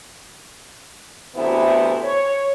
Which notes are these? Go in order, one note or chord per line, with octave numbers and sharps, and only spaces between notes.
D2 C3 E3 B3 E4 C5
C#5